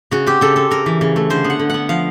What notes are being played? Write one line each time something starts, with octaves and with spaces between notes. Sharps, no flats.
C#3 F#4
C4 G4
C#3 A4
C4 A4
C#3 A#4
E3
C#3
A3
D3 C5
B3
F#5
D3
B3 F#5
F3 F5